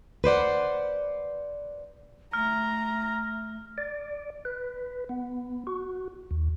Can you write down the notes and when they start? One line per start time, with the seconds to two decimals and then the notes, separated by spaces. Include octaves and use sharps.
0.24 B4 C5 D5 F#5
2.33 A3 A#5 F6
3.78 D5
4.45 B4
5.09 B3
5.67 F#4
6.31 D#2